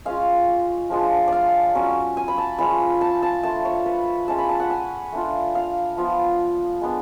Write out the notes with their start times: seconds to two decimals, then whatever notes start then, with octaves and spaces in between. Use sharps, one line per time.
0.05 G#3 C#4 F4 F5
0.90 F3 G#3 D4 F4
1.28 D5 F5
1.75 F#3 C#4 F4
2.17 G#5
2.28 B5
2.38 A5
2.59 F3 G#3 C#4 F4 B5
3.01 A5
3.23 A5
3.43 A3 D4 F4 A5
3.65 C#5
3.86 B4
4.28 G#3 C#4 F4 A5
4.38 B5
4.49 A5
4.60 F#5
4.70 G#5
5.12 A3 D4 F4
5.55 F5
5.97 F3 B3 F4
6.81 G#3 B3 D4